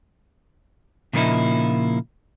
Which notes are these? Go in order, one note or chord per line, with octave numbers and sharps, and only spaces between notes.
A#2 C#3 F3 A#3 D#4 E4